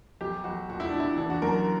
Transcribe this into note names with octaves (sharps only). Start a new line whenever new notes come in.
B1 G4
B1 F#4
A#2 F#4
E4
A#2 D4
E4
E3 D4
F#4
F#2 A#4